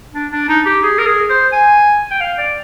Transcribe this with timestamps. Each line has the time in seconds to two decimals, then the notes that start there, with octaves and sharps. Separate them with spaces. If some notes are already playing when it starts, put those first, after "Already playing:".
0.15 D4
0.32 D4
0.49 D#4
0.66 G4
0.83 G#4
0.99 A#4
1.06 G#4
1.30 C5
1.53 G#5
2.11 G5
2.21 F5
2.38 D5